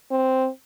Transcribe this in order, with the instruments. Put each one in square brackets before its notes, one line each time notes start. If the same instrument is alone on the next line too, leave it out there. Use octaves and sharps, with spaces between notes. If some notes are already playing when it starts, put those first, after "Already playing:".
[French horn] C4